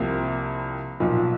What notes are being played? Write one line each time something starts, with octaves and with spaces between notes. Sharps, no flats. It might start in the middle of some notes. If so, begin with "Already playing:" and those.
Already playing: C2 C3 F3 A#3
B1 A#2 F3